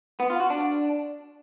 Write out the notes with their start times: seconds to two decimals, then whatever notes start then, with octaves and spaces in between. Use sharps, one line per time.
0.20 B3
0.30 F4
0.40 F#4
0.50 D4